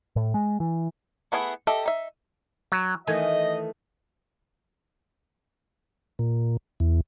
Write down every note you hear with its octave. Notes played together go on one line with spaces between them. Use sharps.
A2
G#3
E3
A3 B3 E4 G#4
G4 A4 D#5 E5
D#4 E5
F#3
D#3 E3 A3 D#5 G#5
A#2
E2